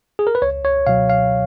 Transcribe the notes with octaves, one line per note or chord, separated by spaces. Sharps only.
G#4
A#4
B4
C#2 C#5
C#5
B2 F#3 F5
F5